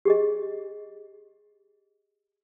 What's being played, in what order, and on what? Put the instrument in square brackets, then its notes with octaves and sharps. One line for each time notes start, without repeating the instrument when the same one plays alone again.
[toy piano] G4 G#4 D#5